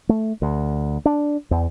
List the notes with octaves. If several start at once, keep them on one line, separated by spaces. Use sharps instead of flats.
A3
D2
D4
E2